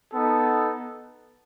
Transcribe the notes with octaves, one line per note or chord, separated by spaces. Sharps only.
B3 D#4 A4